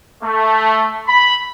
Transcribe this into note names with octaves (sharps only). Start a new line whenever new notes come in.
A3
B5